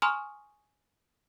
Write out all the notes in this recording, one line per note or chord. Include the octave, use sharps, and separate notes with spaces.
G#5 A#5 C6 C#6 D#6 F6